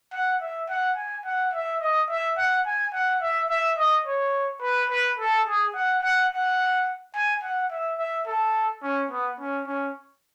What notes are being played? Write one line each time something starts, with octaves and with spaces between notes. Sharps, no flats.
F#5
E5
F#5
G#5
F#5
E5
D#5
E5
F#5
G#5
F#5
E5
E5
D#5
C#5
B4
B4
A4
G#4
F#5
F#5
F#5
G#5
F#5
E5
E5
A4
C#4
B3
C#4
C#4